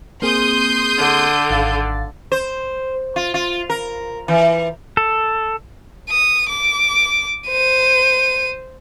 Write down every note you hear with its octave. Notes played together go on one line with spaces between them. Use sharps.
A#3 C4 G#4 C6 D#6 G6
D3
G#1 F5 A6
C5
F4
F4
A#4
E3
A4
D#6
D6
C5 D#7